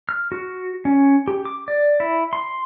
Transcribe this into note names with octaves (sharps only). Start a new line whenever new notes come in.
F6
F#4
C#4
G4
D6
D5
E4
C6